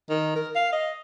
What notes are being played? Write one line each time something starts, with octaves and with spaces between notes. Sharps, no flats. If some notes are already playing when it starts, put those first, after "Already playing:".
D#3
A#4
F5
D#5